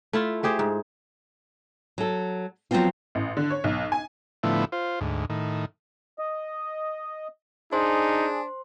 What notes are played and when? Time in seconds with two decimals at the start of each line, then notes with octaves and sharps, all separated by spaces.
0.13 A3 E4 F4
0.43 A3 G4 G#4 C5
0.59 G#2
1.98 F#3 A4
2.71 F3 F#3 G#3 B3 C4 F4
3.15 A1
3.37 D3
3.50 C#5
3.64 B1
3.92 G#5
4.43 A2 D3 F3 A3 B3 E4
4.72 F4 C5
5.01 D2 G#2
5.30 A2 D#3
6.19 D#5
7.73 D4 D#4 G#4 C5 C6